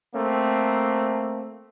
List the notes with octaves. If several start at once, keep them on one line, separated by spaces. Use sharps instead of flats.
A3 A#3 C4